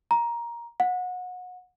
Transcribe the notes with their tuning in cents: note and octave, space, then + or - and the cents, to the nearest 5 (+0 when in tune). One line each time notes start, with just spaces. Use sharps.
A#5 +15
F#5 -25